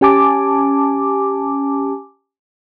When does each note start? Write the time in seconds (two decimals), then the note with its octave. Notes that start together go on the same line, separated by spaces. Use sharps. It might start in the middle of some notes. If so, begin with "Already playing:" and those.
0.01 C#4 G4 G#5 A5 D6